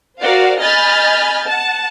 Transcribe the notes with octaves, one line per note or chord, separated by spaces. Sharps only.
F#4 A#4 C5 D5 F5
D#5 G#5 B5 F6 G6 A6
F#5 A5